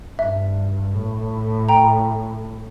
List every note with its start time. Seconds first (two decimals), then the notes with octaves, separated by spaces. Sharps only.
0.19 G2 E5
0.95 A2
1.69 G5 A#5